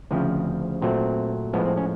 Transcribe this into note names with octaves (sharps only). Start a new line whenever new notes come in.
D2 C#3 F3 C4
A#2 F#3 A3 C4
A2 F3 G#3 B3
C4
C#4